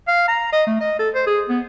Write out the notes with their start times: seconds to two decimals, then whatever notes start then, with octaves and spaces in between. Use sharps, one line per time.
0.08 F5
0.28 A#5
0.52 D#5
0.67 A3
0.81 D#5
0.99 A4
1.14 C5
1.27 G#4
1.49 B3